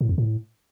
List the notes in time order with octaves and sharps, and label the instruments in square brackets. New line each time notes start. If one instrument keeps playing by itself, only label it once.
[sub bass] A2
E2
A2